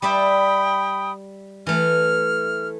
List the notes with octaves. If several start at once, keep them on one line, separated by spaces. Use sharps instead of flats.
G3 D5 E5 G5 B5 D#6
E3 A3 F6